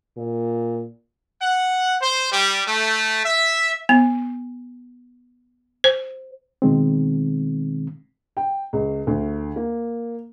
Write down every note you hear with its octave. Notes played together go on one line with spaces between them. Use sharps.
A#2
F#5
C5
G3
A3
E5
B3
C5
B2 D#3 G#3 C4
G5
C#2
D2
A#3